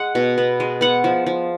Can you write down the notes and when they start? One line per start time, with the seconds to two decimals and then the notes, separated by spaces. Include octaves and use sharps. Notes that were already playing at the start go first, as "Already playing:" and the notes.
Already playing: G#3 F#5
0.15 B2
0.38 B3
0.60 G#3
0.81 B3 F#5
1.04 F3
1.26 F3